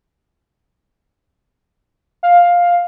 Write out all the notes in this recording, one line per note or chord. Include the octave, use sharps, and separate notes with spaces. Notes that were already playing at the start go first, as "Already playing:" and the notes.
F5